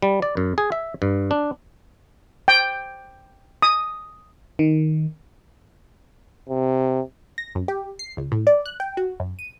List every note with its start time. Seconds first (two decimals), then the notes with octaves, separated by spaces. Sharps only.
0.02 G3
0.22 D5
0.37 F#2
0.58 G#4
0.72 E5
1.02 G2
1.31 D4
2.48 G5
3.62 D#6
4.59 D#3
6.50 C3
7.38 A#6
7.55 F#2
7.68 G4
7.99 C7
8.17 C#2
8.32 A2
8.47 D5
8.66 F#6
8.80 G5
8.97 F#4
9.20 F#2
9.39 D#7